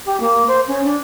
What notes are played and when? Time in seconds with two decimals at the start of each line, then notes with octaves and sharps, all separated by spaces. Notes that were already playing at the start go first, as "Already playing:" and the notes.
0.05 G4
0.20 A#3
0.47 C5
0.67 C#4
0.84 D4